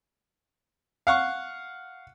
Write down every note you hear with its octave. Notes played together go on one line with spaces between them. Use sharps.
F5 F#5 C#6